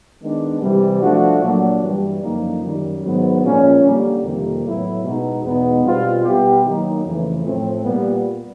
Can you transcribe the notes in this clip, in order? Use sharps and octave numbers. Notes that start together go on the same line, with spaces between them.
D#3 G#3 B3 D4
C3 E3 G3
F3 A3 D4 F#4
A#2 F#3 A#3 D4 F#4
G2 E3 G3
F#2 D3 F3 A#3 D#4
F#2 D#3 G3
G#2 D#3 F#3 B3
A#2 F3 G#3 C#4
D3 G3 A#3
F2 C3 D#3 G3 A#3
A2 F#3 B3 E4
B2 G#3 B3 D#4
E2 B2 G#3 B3 D#4
B2 G3 C4 F4
B2 G3 B3 E4 G4
D#3 F#3 A#3 D#4
F2 C#3 E3 A3
A2 F3 A3 C4
A#2 G3 B3